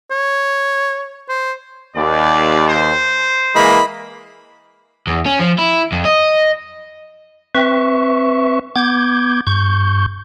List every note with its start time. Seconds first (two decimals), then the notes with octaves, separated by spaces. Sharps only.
0.11 C#5
1.29 C5
1.96 D#2 D5
2.68 C5
3.55 E3 G#3 A#3 D#5 B5
5.07 E2
5.26 C#4
5.39 F3
5.58 E4
5.92 F2
6.05 D#5
7.55 C4 B4 E5 C#6
8.76 B3 D6 G6 G#6
9.47 G2 C#6 G6